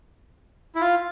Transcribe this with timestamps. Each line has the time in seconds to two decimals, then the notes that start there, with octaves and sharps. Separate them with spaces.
0.75 E4
0.81 F4